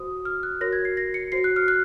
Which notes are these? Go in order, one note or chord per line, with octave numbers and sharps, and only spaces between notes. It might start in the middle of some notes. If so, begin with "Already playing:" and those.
Already playing: F#4 C5 D#6
F6
F#6
F#4 A#4 C#5 A#6
G#6
C7
A#6
C#7
F#4 C5 C7
F#6
F6
F#6